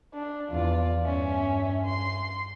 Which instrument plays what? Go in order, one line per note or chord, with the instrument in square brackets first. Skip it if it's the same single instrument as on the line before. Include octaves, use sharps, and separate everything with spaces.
[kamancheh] D4
[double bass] E2 [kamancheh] F4 D5
[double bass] G2 [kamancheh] C#4 E5
[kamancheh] C6